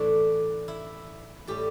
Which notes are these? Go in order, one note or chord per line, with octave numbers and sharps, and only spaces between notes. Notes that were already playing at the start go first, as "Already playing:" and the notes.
Already playing: A2 E3 A3 D4
E4
A2 G3 G4